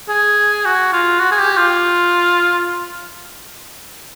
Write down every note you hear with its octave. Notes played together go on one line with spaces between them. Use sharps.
G#4
F#4
F4
F#4
G#4
G4
F4